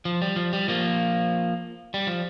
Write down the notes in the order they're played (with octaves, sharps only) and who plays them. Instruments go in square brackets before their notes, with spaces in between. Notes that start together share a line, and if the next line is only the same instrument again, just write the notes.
[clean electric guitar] F3
G3
F3
G3
F3 A#3
G3
F3